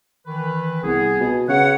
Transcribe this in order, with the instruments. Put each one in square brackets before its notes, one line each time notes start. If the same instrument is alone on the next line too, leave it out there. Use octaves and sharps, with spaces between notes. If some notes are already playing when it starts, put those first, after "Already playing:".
[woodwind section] D#3 E3 B4
[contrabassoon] C2 [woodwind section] B3 G#4
[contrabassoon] B2
[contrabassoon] C#3 [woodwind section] B4 C#5 F#5